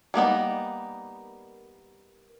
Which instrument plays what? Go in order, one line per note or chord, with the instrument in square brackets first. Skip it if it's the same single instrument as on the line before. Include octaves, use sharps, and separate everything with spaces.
[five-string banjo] G3 A#3 B3 D#4